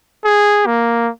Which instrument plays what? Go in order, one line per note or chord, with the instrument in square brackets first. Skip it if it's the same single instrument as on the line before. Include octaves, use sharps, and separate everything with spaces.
[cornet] G#4
A#3